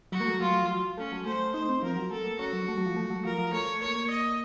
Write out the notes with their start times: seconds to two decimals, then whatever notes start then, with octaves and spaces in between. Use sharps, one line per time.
0.12 F#3 F#4
0.20 A#3
0.27 A3
0.40 F#3 F4
0.62 F3
0.69 F#3
0.97 A3 C#4
1.12 F#3
1.26 A3 C5
1.54 D#4 C5
1.69 C4
1.83 F3 A#4
1.96 F#3
2.10 A3 A4
2.25 A#3
2.39 C#4 F#4
2.53 F#3
2.68 A3
2.77 F#3
2.86 F3
2.97 A3
3.10 F#3
3.25 F3 A#4
3.38 F3
3.53 A3 C#5
3.81 A#3 C#5
3.95 A#3
4.09 D#5